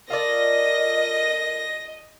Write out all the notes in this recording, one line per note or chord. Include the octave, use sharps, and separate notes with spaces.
F4 A4 A#4 D5 D#5 A#6